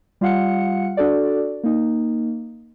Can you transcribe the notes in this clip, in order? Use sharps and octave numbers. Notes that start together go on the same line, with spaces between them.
G3 F4 F5 F#5 C#7
D4 F#4 A4 D5
A#3 D#4